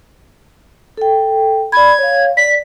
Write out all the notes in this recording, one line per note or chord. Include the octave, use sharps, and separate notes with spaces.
A4 G5
D5 B5 G#6
C#5 F5
D5 B6